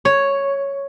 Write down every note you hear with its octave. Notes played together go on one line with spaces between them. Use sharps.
C#5